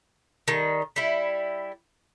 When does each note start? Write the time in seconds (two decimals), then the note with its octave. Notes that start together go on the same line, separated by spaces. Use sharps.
0.48 D#3 G3
0.96 G3 E4